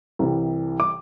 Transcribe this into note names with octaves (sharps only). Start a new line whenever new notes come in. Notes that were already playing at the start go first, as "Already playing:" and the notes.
C2 C3 E3
D6